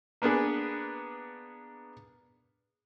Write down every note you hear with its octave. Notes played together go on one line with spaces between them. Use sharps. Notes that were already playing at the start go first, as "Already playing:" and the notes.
A#3 B3 D4 G#4 B4